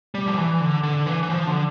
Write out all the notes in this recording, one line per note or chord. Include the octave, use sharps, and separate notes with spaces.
G3
F3
E3
D3
D3
E3
E3
F3
D3